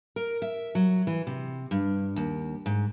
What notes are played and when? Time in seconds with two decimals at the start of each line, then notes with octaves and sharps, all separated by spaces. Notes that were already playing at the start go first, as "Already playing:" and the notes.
0.16 A#4
0.42 E5
0.75 F#3
1.07 E3
1.27 C3
1.71 G2
2.16 D#2
2.66 G#2